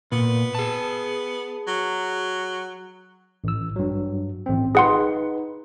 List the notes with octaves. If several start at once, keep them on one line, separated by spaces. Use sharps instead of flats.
A#2 B3
G#4 A5
F#3
A1 E6
G2 F#3
A1 C4
D#4 G#4 B4 F#5 C6